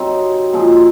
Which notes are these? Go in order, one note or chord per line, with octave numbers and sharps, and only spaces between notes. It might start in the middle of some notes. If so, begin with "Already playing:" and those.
Already playing: C3 F#3 C4 D#4
A#2 F3 G#3 C4